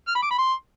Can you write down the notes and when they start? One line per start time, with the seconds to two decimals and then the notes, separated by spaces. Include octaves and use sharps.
0.08 F6
0.15 B5
0.23 D6
0.31 B5
0.38 C6